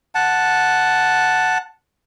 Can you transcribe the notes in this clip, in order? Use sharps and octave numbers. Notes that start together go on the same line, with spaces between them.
F#5 A5